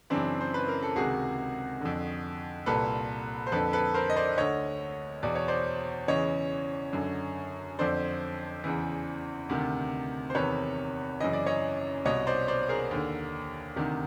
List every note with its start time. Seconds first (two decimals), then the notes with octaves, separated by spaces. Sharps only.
0.10 F#2 C#3 E3 C4 D4
0.41 C5
0.54 B4
0.68 A#4
0.82 A4
0.96 C#2 C3 D#3 F#4 G#4
1.81 F2 D3
2.66 C2 A#2 A4 B4
3.47 C5
3.52 F2 D3 A4 B4
3.73 A4 B4
3.94 A#4 C5
4.10 D#5
4.16 C5 D5
4.38 D2 D3 C#5 D#5
5.23 E2 B2 D5
5.35 C#5
5.48 C5 D5
6.08 E2 C#3 E3 C#5 D#5
6.93 F#2 D3
7.79 F2 D3 C5 D5
8.64 E2 C#3 E3
9.49 D2 C3 D#3
10.30 C5
10.35 E2 C3 D#3 B4 C#5
11.20 F#2 C#3 E3 D#5
11.33 D5
11.46 C#5 D#5
12.05 C2 B2 C#5 D#5
12.27 C5 D5
12.48 C5 D5
12.69 G#4 A#4
12.91 D#2 D3
13.76 D2 C3 D#3